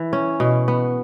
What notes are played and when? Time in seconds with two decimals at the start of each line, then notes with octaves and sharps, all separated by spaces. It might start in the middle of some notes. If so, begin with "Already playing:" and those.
Already playing: E3
0.13 C#4
0.40 B2
0.68 B3